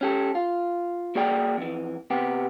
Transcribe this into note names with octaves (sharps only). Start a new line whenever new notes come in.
C#4 G4 A4
F4
A#3 F#4 G#4 D5 G5
F2 E3
C3 B3 G4